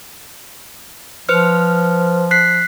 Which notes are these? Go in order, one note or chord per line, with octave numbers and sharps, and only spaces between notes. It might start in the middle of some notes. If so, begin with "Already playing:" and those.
F3 B4 C5 F6
F#6 B6 C7